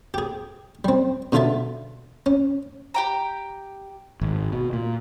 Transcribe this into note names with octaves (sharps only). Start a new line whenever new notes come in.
G4 G#4
G3 C4
B2 D3 F4 A4 E5 A5
C#4
G4 G5 A#5
G#1
B2
A#2